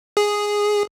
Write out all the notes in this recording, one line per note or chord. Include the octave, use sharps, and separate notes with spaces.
G#4